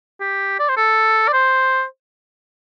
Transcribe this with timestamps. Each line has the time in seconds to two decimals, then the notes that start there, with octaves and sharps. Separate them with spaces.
0.20 G4
0.59 D5
0.69 C5
0.77 A4
1.28 D5
1.33 C5